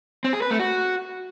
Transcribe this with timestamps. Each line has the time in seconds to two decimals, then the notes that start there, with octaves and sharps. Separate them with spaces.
0.24 C4
0.33 G#4
0.42 B4
0.51 A3
0.59 F#4